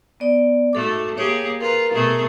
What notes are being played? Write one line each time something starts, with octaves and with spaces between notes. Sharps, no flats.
B3 D5
G#2 A3 F#4 A4 D6
A#3 G4 G#4 C#5
F4 A#4 B4 A#5
B2 A3 G#4